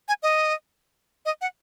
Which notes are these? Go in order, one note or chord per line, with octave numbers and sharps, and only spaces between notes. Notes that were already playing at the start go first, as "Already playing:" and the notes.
G#5
D#5
D#5
F#5